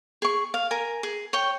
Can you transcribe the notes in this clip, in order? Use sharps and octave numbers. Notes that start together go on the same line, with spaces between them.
G#4 C#6
F5
A#4 G#5
G#4
C#5 G5